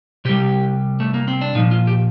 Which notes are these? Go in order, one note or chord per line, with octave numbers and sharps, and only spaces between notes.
C3 G3 G4
A3
A#3
C4
D4
A#2 F3 D#4
F4
G4